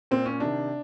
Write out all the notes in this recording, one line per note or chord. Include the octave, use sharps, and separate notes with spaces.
A#2 C4
C#4
C3 D#3 D4